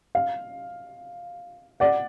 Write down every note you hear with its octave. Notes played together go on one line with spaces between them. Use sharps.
F5
D5 F#5